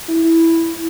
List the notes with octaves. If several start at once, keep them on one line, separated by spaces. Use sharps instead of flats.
E4